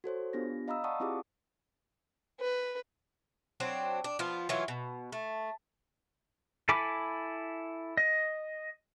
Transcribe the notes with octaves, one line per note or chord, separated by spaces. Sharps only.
F#4 A4 C5 C#5
B3 D4 F4 G4 A#6
D#5 F5 A#5 B5 D#6 E6
D5 F5 F#5 A5 C#6 D#6
C4 E4 F4 G4 G#4 D6
B4
F#3 C4 D4
D4
F3 B3 F4
E3 F#3 F4
B2
A3
E4 A4 G#5 B5 D6
D#5